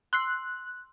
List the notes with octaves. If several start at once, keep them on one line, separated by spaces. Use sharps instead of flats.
C6 E6 F#6 C7